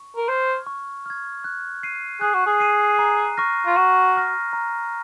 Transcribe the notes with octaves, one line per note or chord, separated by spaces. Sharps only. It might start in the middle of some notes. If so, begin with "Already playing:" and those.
Already playing: C#6
A#4
C5 F6 G#6
C#6
F6 G#6
F#6
C7 D#7
G#4 F#6
F#4
G#4
C7 D#7
A#5
C#6 F6 A#6
F4
F#4 A#5
C#6 F6 A#6
A#5